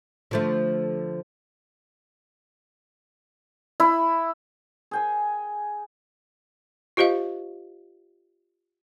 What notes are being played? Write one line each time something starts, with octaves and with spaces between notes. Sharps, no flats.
D3 F3 A3
E4
G#4 G5 G#5
F4 G4 C5 D#5 F5